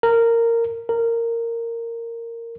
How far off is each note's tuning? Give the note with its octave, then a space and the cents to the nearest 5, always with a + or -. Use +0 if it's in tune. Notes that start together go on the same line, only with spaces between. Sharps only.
A#4 -10
A#4 -10